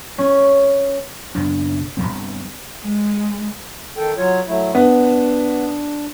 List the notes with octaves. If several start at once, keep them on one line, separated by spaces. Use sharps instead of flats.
C#4
F#1 B1 D4
G1 E2 G3 C4
G#3
D#3 A4 G5
F#3 F4 C#5
F#3 A3 E4
B3 D4